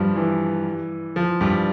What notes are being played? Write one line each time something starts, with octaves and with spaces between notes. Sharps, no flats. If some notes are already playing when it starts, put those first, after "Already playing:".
Already playing: G2 F3 G3
E3
F3
G2 G3